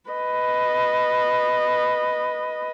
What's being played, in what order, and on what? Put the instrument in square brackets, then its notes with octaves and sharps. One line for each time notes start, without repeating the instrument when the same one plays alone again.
[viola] B4 D#5